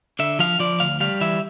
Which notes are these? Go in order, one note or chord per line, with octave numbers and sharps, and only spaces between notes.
D3 E5
F3 F5
F3 D5
D2 F5
G3 F5
E3 E5